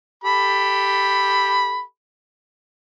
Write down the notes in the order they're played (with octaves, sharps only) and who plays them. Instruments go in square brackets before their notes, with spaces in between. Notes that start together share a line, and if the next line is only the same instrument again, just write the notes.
[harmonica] G4 A4 B5